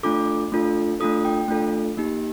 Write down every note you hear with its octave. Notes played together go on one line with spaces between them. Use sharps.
A3 D4 F4 A4 D6
A3 D4 F4 A4
A3 D4 F4 A4 D#6
G5
A3 D4 F4 A4
A#3 D#4 G4